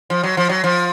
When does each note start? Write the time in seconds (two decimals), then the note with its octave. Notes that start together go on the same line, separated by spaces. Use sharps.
0.10 F3
0.23 F#3
0.37 F3
0.49 F#3
0.64 F3